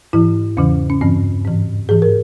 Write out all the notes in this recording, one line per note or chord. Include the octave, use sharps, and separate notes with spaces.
G#2 E3 E4
E2 C#3 E3 C#4
C#4
G2 E3 C4
G#2 E3
G#2 E3 G#4
A#4